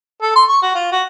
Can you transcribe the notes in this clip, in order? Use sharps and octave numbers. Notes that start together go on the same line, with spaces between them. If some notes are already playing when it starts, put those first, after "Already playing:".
A4
C6
C#6
F#4
F4
F#4